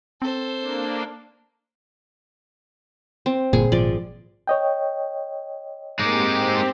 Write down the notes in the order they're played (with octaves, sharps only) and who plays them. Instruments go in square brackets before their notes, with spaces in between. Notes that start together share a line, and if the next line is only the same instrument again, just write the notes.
[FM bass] C4 [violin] A4 C5
[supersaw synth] A#3 D4
[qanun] C4
[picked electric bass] G1 [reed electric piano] A#2 [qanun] G#4
[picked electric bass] G#1 F3 [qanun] D5
[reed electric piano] C#5 D#5 G5
[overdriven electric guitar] G#3 D#4 [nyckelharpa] A#3 D6 [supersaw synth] C4 G4